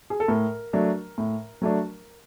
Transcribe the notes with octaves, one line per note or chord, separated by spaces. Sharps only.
G#4
A4
A2 A#4
F#3 A3 D4
A2
F#3 A3 D4